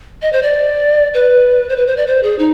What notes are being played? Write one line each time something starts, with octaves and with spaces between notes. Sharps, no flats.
D#5
C5
D5
B4
C5
B4
C5
D5
C5
G#4
D#4